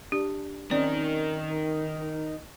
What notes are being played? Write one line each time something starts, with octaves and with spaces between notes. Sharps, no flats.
D4 G4
D#3 C4 C#4 D#4 A#4 D5